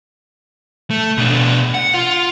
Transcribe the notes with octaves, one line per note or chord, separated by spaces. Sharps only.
A3
B2 D4
F#5
F4